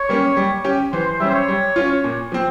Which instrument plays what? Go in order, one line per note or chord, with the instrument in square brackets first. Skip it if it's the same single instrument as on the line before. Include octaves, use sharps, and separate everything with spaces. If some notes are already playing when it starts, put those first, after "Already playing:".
Already playing: [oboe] C#5
[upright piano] G3 A#3 C#4
G3
C#4 G4
[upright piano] E3 [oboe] C5
[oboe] C5
[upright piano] G3 C#4 [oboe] E5
[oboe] C5
C#5
[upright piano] G3
C#4 F4
A#2
F3 C4